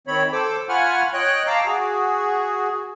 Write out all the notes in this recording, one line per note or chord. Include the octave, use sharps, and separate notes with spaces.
D#3 C4 C#5 B5
A4 C5 D6 E6
F4 F#5 G#5 B5 C#6 F6
C#5 D#5 G5 F#6
F5 A5 A#5 D6 E6
F#4 G#4